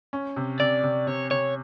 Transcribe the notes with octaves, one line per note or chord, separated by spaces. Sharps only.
C#4
C3
C3 D5
C3
C3 C#5
C3 C#5